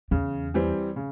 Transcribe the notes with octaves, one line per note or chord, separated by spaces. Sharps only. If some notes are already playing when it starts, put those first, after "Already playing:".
E2 C#3
E3 G3 C4
C#3